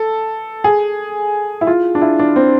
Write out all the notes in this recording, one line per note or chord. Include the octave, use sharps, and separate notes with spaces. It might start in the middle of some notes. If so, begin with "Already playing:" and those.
Already playing: A4
G#4
E4
F4
D4
E4
D4
C4